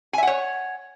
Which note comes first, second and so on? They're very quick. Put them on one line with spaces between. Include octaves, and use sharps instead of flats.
G#5 E5 F#5 C#5